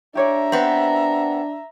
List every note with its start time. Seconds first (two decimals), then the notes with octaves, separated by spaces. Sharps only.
0.15 D4 G4 C#5 D5 E5 A#5
0.52 B3 C4